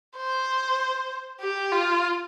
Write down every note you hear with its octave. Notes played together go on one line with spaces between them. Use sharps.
C5
G4
F4